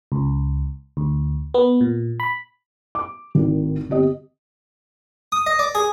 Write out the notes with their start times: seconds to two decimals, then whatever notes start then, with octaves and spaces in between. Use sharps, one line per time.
0.12 C#2
0.97 D2
1.54 B3
1.81 A#2
2.20 B5
2.95 D6
3.35 G#1 A2 D#3
3.89 G1 C4 G4 D#5
5.32 D#6
5.47 D#5
5.59 D5
5.75 G#4